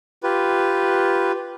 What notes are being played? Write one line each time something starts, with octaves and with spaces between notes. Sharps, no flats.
F4 G4 B4